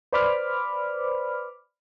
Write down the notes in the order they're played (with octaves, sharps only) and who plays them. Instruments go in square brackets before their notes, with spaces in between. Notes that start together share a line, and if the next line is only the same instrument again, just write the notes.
[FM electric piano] B4 C5 D5 B5 D6 F6